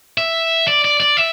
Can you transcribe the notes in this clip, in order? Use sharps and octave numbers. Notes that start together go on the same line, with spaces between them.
E5
D5
D5
D5
E5